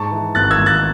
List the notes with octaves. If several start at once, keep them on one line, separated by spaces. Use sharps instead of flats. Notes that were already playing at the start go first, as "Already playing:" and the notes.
Already playing: G#2 A5 C#6
E3
G#1 F#6 A6
E6 G#6
G#1
F#6 A6